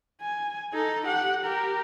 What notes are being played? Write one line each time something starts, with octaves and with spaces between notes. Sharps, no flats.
G#5
D#4 A4
G4 F#5
G4 A#4